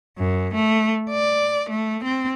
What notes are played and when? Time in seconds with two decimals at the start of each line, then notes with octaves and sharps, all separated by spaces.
0.18 F#2
0.54 A3
1.10 D5
1.70 A3
2.04 C4